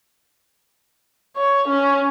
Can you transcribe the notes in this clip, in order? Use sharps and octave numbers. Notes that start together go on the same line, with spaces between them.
C#5
C#4